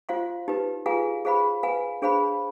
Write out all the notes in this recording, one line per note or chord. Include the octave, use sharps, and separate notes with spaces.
F4 C5 F5 C6
D#4 G4 B4
F4 G#4 B4 F5 G#5
G#4 C5 F5 B5
B4 F5 G#5
D4 G#4 C5 F5 B5